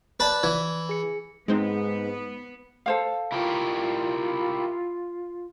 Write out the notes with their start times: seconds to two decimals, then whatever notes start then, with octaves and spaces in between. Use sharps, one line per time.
0.20 B4 D5 A5 F#6
0.43 E3 G#6
0.89 G#4 C#7
1.48 G#2 G#3 B3 C4 D#4
2.86 A4 C5 F5
3.32 E4 F4 G4 A#4